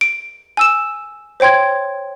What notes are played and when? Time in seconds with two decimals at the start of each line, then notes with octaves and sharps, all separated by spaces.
0.01 D7
0.57 G#5 E6 E7
1.40 C5 C#5 G5 C6 G#6